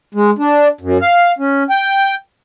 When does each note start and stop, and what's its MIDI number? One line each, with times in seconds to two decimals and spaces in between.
0.15 0.30 56
0.38 0.68 62
0.81 0.98 42
1.01 1.32 77
1.39 1.63 61
1.70 2.15 79